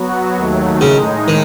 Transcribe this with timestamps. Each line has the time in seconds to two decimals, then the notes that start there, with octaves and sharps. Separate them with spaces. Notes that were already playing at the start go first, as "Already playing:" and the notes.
Already playing: F#3 B3 F#4
0.36 D#2 D#3 F#3 A3
0.81 A2 C#3 G#3 D#4
1.28 D#3